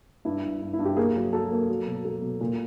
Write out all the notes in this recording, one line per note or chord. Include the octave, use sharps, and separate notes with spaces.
G2 E4
G2
G2
E4
G2
G4
A#3 G#4
F#3
F#3 A4
A#3
F#3
B2
F#3 A4
B2
A#2